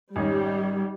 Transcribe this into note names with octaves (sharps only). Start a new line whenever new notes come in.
G#1 G3 C#4 D#4